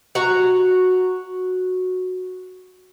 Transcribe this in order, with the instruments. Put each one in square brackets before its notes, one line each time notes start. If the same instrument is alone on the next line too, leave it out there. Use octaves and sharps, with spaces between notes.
[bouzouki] F#4 A#5